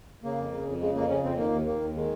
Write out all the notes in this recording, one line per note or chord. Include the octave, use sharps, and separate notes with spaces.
C#3 A#3
F2
C#3
F2
C#3 G#3
F2 A#3
C#3 C#4
F2 C4
D#3 A#3
D#2
D#3 A#3
D#2
D#3 G#3